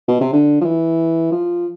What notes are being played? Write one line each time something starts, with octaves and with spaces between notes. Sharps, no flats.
B2
C3
D3
F3
E3
F3